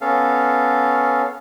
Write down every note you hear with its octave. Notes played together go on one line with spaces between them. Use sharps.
B3 C#4 A4 F5